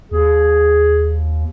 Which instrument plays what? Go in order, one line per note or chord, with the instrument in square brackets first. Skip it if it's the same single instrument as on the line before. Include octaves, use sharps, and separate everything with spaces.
[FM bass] D#2 [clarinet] G#4